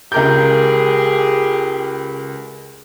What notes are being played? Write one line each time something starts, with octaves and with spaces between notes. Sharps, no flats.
C#2 G4 G#4 A#4 G6